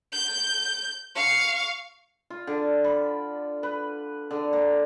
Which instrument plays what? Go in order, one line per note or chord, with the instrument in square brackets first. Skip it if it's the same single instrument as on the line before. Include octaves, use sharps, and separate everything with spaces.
[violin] G6
F5 C#6
[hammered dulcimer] F4
D3
B5
B4
D3
A#3